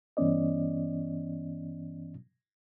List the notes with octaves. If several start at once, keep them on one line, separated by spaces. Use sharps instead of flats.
G2 E3 B3 C#4 D5 D#5